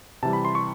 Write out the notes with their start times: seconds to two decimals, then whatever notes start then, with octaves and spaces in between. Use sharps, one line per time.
0.23 C3 E3 G3 A5
0.33 B5
0.45 C6
0.55 C#6